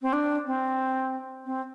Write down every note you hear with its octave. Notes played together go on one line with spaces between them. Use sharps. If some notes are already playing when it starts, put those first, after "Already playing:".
C4
D4
C4
C4